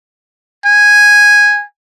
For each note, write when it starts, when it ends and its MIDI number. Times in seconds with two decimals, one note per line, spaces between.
0.66 1.64 80